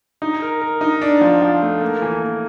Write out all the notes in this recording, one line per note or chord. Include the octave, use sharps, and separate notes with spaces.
D#4
A#4
A#4
D#4
D4
F3
F3
A3
A#3
E3
A#3